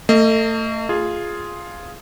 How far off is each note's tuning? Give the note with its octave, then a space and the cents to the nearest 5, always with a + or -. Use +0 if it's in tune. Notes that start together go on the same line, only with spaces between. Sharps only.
A3 +35 D#5 +0
F4 +0 G#4 +0